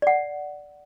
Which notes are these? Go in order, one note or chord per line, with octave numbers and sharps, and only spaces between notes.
D5 F#5